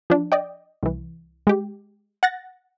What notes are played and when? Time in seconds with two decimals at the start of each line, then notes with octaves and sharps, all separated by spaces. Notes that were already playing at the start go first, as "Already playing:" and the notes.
0.10 F3 D4
0.32 D5 D#5 G5
0.83 C2 E3
1.47 G#3 G4
2.23 F#5 F#6 A6 A#6